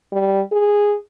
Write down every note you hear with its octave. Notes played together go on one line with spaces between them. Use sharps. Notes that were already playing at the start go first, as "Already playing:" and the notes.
G3
G#4